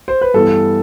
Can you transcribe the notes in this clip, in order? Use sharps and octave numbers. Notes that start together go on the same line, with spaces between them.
C5
B4
G2 E3 B3 A4